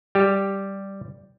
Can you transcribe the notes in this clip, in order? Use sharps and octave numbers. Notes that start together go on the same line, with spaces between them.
G3 G4